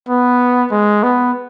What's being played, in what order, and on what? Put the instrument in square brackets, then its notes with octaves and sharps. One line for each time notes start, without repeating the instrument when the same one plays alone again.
[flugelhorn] B3
G#3
B3